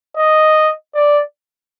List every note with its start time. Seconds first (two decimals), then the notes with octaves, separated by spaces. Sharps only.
0.17 D#5
0.95 D5